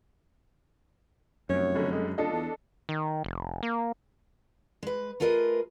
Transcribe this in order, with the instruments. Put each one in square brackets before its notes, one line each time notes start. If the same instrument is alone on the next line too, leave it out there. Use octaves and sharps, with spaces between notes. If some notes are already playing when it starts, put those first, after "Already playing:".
[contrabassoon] F1 [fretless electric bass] F#2 [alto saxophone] C#5
[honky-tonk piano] F#1 D3
[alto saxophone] G#3
[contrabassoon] D#1 [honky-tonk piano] D4 A4 D#5 [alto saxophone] F4
[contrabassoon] E2
[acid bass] D#3
F1
A#3
[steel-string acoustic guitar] G#3 B4
A3 F4 G#4 A#4 B4 D#5